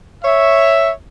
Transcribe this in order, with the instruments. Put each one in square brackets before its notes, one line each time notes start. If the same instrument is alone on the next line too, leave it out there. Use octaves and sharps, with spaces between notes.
[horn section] C#5 E5